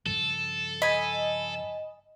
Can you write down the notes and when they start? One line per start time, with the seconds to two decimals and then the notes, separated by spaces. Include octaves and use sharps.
0.06 G2 C#3 F3 A4
0.82 D#5 G#5 B5